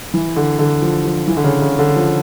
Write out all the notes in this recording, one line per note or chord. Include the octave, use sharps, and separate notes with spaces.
E3
D3
D3
F3
F3
E3
D3
C#3
C#3
D3
F3